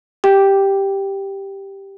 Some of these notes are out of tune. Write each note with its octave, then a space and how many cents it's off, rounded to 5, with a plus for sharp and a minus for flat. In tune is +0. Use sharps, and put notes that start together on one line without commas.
G4 +0 G5 +0